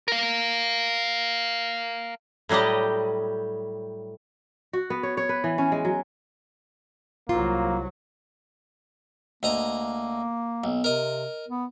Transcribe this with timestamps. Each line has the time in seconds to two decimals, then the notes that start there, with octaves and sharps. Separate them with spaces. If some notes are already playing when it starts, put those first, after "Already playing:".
0.08 A#4 F5
2.49 A2 F#3 G3 G4 D#5
4.73 F#4
4.90 B3
5.03 C#5
5.17 C#5
5.29 B4
5.44 E3
5.58 C#4
5.72 G#3
5.85 F#3
7.29 C2 F#3 A#3 F4
9.43 D2 A#3 D#5 A#5
10.64 B1
10.84 C3 A#4 D#5
11.48 B3